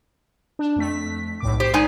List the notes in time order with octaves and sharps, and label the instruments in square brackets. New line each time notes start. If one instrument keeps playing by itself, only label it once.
[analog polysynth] D4
F2 A3 B6
B1 A2 D6
[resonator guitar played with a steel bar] G4 [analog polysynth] C5 C7
[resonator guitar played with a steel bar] G#3 D#4 G#5 [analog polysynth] D5